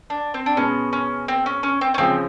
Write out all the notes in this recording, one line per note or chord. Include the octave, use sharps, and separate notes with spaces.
D4
C4
D4
B2 G#3 B3 C#4
C#4
C4
C#4
C#4
C4
C#4
C#3 F3 G#3 C4